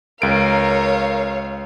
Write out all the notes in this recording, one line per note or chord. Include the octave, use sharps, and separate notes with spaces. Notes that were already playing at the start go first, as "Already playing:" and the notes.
C#2 A#4 C#5 F5 D7